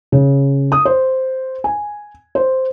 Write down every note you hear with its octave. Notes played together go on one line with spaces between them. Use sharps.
C#3
D#6
C5
G#5
C5